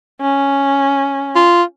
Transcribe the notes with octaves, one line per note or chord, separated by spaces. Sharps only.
C#4
F4